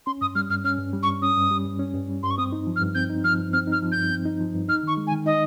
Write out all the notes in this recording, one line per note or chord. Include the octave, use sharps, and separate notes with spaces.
C#4 C6
G2 D#6
G3 F6
G2 F6
C#4 F6
G2
G3
C#6
G2
C#4 D#6
G2
G3
G2
C#4
G2
G3
G2 C6
C#6
C4 D#6
D#4
F3
F6
G2
C4 G6
D#4
F3 F6
G2
C4 F6
D#4 F6
F3
G2 G6
C4
D#4
F3
G2
D#4 F6
D#3 C#6
G#3
G#5
D#3
D#4 D#5